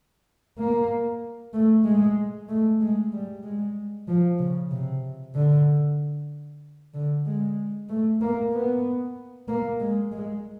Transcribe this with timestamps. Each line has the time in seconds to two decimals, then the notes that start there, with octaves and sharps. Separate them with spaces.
0.58 A#3
1.53 A3
1.84 G#3
2.49 A3
2.81 G#3
3.13 G3
3.43 G#3
4.08 F3
4.39 C#3
4.71 C3
5.34 D3
6.94 D3
7.26 G#3
7.89 A3
8.21 A#3
8.53 B3
9.48 A#3
9.80 G#3
10.12 G#3